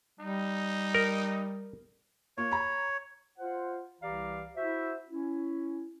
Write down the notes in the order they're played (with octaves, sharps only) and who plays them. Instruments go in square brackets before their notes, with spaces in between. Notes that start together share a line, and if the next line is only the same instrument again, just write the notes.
[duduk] G3 [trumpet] D#4
[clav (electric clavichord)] A#4
[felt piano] A#3 F4 [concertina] C#5
[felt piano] A#5 B5
[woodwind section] F4 C5 F#5
C2 E3 G4 D5 F5 A#5
E4 F#4 C5 E5
C#4 E4